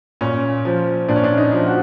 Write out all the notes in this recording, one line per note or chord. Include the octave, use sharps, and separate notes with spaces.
A#2 C#4
F3
A#2 D4
C#4
D4
D#4
F3
F#4